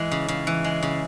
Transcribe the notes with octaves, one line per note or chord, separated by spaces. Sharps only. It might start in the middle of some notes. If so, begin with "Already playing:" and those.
Already playing: E3 G#3
C#3
C#3
E3
G#3
C#3